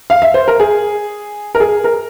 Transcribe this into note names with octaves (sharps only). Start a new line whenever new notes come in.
F5
E5
C5
A#4
G#4
A#4
G#4
A#4